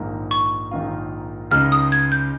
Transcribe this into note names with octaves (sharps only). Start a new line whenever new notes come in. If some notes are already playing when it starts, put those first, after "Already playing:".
Already playing: A#1 G#2 D#3 A#3 F4
C#6
A#1 G#2 D#3 A#3 F4
C#2 C#3 G#3 D#4 F6
D#6
G#6
G6